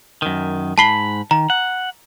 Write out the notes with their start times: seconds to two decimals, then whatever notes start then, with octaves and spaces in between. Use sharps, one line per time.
0.22 F#2 D#3
0.78 G#2 A5 B5 C7 G7
1.31 D#3 A#5
1.50 F#5